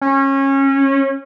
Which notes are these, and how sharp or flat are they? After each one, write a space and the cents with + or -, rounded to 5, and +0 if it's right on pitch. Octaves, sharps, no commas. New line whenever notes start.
C#4 -25